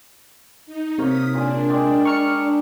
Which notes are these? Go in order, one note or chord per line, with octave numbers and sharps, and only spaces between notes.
D#4
C3 A#3 C#5 D#6 B6
A#2 D4 G#4 G#5
G#3 G4 D5
A#5 C#6 F6 C#7